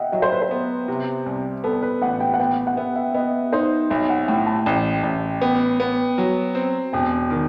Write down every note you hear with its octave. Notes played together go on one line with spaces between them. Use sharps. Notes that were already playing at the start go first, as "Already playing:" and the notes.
Already playing: D#5 E5 F#5 G5
F#3 D#5
C5
B4
C5
B3
C3
C2
B3 A4
B4
A1 F#5
G5
F#5
B3 G5
F#5
B3 E5
E5
B3 D#5
D#4 C5
B1 E5
F#5
A2 G5
A5
A1 G5
A1
B3 G5
B3
F#3
C4
E1 G5
D#3